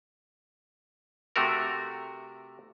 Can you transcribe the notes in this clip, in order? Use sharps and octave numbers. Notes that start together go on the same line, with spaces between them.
C3 A3 F#4 A#4